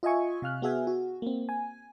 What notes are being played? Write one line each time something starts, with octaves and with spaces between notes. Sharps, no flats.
F4 D#5 E5 G#5 C#6
C3 F5 F6 F#6
B3 F#4 G#4 E5 G#5
F#4
A#3 C4
G#5